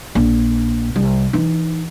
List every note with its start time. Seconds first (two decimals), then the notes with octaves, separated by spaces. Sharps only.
0.15 A#1
0.96 C2
1.33 E3 D#4